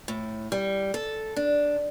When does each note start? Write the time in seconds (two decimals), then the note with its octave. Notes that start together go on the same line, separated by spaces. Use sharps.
0.08 A2
0.52 G3
0.94 A4
1.36 D4